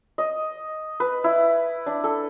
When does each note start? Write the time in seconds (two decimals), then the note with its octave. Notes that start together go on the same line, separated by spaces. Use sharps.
0.18 D#5
1.00 B4
1.24 E4
1.86 D4
2.04 A4